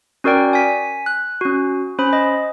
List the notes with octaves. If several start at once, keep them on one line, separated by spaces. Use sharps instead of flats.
C#4 F#4 A#4 D5 G5
G#5 B6
F#6
C#4 F#4
C#4 C5 B5
D#5